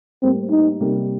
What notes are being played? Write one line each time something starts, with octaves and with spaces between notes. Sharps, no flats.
A2 G3 A#3 C4
D#4
C3 G3 A#3